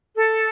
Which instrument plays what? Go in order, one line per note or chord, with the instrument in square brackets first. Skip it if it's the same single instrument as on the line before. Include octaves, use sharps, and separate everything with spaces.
[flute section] A4